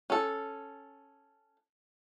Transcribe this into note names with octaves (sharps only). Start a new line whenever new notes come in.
C#4 A4